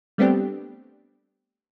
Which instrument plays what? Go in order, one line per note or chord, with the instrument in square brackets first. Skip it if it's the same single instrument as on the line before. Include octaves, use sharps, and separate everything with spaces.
[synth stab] G3 A3 B3 C4 D4 G4